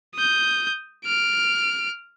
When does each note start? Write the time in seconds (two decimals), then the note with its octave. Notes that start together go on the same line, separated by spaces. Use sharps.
0.15 D#6 G6
1.05 F6 D7